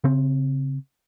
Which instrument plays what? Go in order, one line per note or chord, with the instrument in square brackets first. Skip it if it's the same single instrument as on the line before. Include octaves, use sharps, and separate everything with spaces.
[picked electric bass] C#3 C4